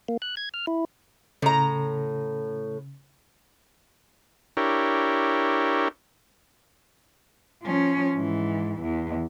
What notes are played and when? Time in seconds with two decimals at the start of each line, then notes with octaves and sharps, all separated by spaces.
0.08 A#3
0.22 F#6
0.37 G#6
0.54 F6
0.67 E4
1.42 A2 C#3 A#5
4.57 D4 E4 G4 A#4 C#5
7.63 F3 C#4
8.14 G#2 E3
8.82 E2